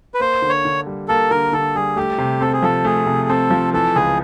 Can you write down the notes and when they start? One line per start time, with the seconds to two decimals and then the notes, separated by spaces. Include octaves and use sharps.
0.14 B4
0.20 A#3 C5
0.42 D3
0.49 C#5
0.65 D3
0.86 G3
1.08 A#3 A4
1.30 D3 A#4
1.52 D3 A4
1.75 G3 G#4
1.96 A3 G4
2.18 C3
2.41 C4 A4
2.53 G#4
2.62 F3 A4
2.85 A3 G#4
3.06 C3
3.29 C4 A4
3.50 F3
3.74 E3 A4
3.95 C#2 G#4